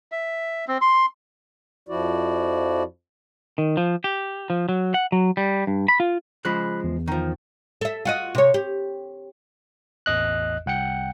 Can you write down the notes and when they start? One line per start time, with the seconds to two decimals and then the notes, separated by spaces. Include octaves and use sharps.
0.12 E5
0.68 C4
0.81 C6
1.89 F2 F3 E4 F#4 D5
3.58 D#3
3.77 F3
4.04 G4
4.50 F3
4.69 F#3
4.94 F#5
5.12 F#3
5.37 G3
5.67 G2
5.88 B5
6.00 F4
6.45 C#3 F3 G#3 B5 F#6
6.84 E2
7.08 D#3 F3
7.81 A4 E5
8.05 F4 F#4 D#5
8.35 C3 C#5
8.54 G4
10.06 A1 E2 D#5 F#6
10.66 C2 F#5 G5 C#7